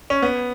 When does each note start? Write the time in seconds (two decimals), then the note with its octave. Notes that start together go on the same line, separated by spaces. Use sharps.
0.10 C#4
0.22 B3